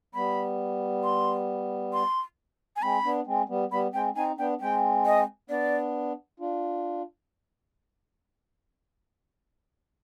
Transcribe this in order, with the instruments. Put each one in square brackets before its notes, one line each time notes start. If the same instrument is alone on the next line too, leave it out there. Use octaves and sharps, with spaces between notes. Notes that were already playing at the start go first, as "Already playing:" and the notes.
[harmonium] G3 B3 [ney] B5
[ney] C6
C6
G#5
[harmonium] G#3 C4 [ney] B5
[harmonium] B3 D4
G#3 C4
G3 B3
[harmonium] G3 B3 [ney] B5
[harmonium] G#3 C4 [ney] G5
[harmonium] C4 D#4 [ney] G#5
[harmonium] B3 D4 [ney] G5
[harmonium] G#3 C4 [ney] G5
[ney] D#5
[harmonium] B3 D4 [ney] D5
[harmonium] D4 F4